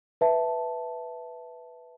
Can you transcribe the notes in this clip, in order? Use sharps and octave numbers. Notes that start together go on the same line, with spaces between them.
B4 E5 A5